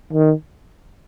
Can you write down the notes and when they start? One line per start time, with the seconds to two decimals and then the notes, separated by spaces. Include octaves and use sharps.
0.13 D#3